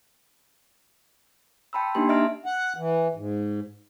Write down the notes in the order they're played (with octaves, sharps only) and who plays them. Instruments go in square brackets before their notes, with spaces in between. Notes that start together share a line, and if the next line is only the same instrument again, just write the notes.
[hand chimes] G5 A5 B5 C6 E6
A#3 D4 D#4 G4 C6
D#5 E5 A#5 F6 D7
[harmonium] F#5
E3
G#2